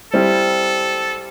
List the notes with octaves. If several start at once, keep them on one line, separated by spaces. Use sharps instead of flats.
G3 C4 E4 A4